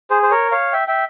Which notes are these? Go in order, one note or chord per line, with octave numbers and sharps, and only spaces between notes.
G#4 C5
C5
A#4 C#5
C#5 F5
E5 G5
E5 G5